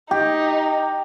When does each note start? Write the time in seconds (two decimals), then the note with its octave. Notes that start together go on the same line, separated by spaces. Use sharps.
0.11 D#4 G4